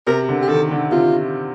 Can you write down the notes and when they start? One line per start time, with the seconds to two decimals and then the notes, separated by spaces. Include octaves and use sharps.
0.07 C3 A#4
0.29 D3
0.43 G4
0.49 D#3 A4
0.71 D3
0.92 C3 F4